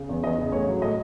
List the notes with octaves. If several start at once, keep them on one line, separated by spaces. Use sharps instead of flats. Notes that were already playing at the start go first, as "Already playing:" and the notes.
Already playing: C#3
E2
E2 D#5
C#3
A2 C#5
F#3
A2 D#5